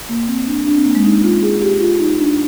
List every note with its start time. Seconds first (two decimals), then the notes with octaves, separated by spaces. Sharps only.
0.09 A#3
0.28 C4
0.47 D4
0.66 D4
0.76 C4
0.85 A#3
0.95 G#3
1.05 D#4
1.23 F4
1.42 G#4
1.62 G4
1.80 F4
2.00 D#4
2.19 D4